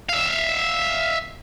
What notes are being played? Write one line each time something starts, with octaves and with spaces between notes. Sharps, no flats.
E5 F5